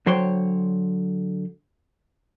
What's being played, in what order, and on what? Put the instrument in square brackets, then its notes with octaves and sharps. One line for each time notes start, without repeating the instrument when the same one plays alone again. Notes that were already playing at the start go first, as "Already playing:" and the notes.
[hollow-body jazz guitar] D3 F#3 C5 C#5 G5 C6